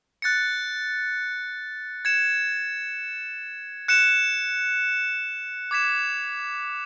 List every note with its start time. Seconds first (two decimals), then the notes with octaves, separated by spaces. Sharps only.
0.22 F#6 A6 C#7
2.05 G#6 C#7 E7
3.88 F#6 C#7 E7
5.71 D6 G#6 B6 E7